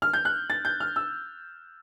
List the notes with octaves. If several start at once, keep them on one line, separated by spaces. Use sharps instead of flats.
F6
G6
F#6
A6
G6
F6
E6